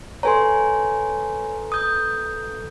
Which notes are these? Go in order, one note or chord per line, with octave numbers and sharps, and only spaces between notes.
A4 B4 C#5 G#5 A#5 C6
D#6 G6